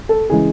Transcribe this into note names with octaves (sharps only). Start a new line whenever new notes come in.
A4
C#3 E3 G#3 G#4